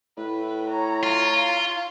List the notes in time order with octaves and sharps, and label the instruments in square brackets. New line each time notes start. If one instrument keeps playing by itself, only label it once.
[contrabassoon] A2 [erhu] B4
[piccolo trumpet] C#5 [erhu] A#5
[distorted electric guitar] F4
[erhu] F5